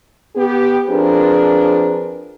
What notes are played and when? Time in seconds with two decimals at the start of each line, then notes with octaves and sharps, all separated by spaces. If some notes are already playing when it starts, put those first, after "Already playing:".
0.36 B3 G4
0.88 F3 C4 D4 G#4 A#4 B4